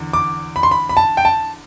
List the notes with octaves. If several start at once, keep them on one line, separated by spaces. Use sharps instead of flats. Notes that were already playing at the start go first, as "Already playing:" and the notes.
Already playing: E2 D3
D6
B5
C6
B5
B5
A5
G5
A5